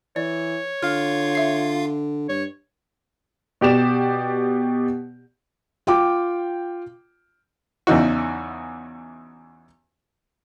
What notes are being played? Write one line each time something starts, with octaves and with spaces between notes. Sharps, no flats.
E3 C#5 D5
D3 F4 F5 F6
E5 C7
G2 C#5
B2 G4 D5 E7
F4 G5 D6
E2 C#3 E3 D#4 F#4